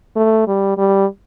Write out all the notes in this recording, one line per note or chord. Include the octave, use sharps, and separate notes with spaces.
A3
G3
G3